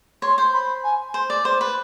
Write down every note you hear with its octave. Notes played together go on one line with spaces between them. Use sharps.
C#5 C6
C5 C6
B5
G#5
C5
D5
C5
B4